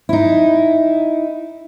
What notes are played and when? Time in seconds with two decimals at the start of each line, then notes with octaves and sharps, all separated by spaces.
0.09 D#4 E4